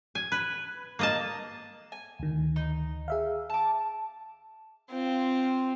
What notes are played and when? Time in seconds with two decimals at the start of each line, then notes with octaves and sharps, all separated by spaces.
0.15 G#5
0.32 B4
0.99 A#3 D#5 A5
1.92 G#5
2.19 D2 D#3
2.56 D#4
3.08 G#4 E5 F5
3.50 A5 D6
4.90 C4 F4